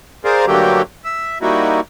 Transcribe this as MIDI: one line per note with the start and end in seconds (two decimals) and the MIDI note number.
0.25 0.45 68
0.25 0.45 70
0.25 0.45 72
0.25 0.45 74
0.25 0.45 77
0.46 0.82 43
0.46 0.82 50
0.46 0.82 54
0.46 0.82 57
0.46 0.82 58
0.46 0.82 67
1.04 1.38 76
1.42 1.80 55
1.42 1.80 58
1.42 1.80 63
1.42 1.80 64
1.42 1.80 66